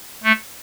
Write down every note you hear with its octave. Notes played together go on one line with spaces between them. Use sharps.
A3